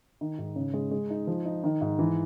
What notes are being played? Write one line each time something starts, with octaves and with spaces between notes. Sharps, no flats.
D#3
G#2
C#3
G#3
G#3
D#4
F3
D#4
D#3
G#2
E3